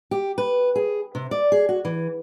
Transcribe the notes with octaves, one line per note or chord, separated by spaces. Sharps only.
G4
B4
G#4
C3
D5
G#4
F#4
E3